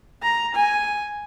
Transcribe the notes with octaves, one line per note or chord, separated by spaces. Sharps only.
A#5
G#5